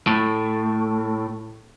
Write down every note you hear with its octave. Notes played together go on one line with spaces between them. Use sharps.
A2 A3